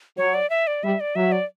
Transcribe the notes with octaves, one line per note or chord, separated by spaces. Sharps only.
F#3 C#5
D5
E5
D5
G3 E5
D5
F#3 E5
D5